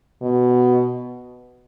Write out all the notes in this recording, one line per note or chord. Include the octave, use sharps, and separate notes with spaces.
B2